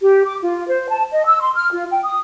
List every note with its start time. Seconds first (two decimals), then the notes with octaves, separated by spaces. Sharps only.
0.01 G4
0.25 D6
0.41 F4
0.67 C5
0.89 A5
1.12 D#5
1.25 E6
1.40 C6
1.55 F6
1.71 F4
1.92 G5
2.05 D#6